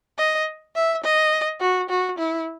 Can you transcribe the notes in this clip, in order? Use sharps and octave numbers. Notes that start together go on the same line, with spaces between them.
D#5
E5
D#5
F#4
F#4
E4